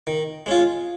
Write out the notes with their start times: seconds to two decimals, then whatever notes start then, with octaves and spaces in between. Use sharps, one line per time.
0.07 D#3
0.46 G#3 C#4 F4